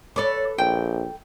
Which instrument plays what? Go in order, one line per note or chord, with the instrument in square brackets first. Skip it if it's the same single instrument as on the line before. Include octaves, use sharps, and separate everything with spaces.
[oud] A4 B4 C#5 [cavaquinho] D5 D6
[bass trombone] A#1 [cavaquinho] G5